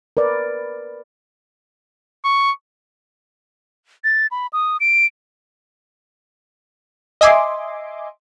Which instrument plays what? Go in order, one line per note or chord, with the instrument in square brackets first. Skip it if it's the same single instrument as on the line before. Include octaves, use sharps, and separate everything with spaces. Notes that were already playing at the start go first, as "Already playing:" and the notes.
[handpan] A#4 B4 D5
[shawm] C#6
[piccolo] A6
B5
D#6
D7
[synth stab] D#5 E5 G#5 C6 D6